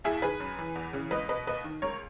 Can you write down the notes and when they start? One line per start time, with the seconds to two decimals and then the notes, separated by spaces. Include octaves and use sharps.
0.04 D#2 E4 G#4
0.22 D#3 G#4 B4
0.40 F#2
0.59 E3
0.75 E2
0.93 C#3 E3
1.11 C#2 B4 D#5
1.29 B2 B4 D#5
1.47 D#2 B4 D#5
1.64 D#3
1.82 C#2 A#4 C#5